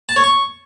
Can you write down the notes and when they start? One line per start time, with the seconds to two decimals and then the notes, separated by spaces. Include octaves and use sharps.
0.09 A5
0.16 C#5
0.24 C#6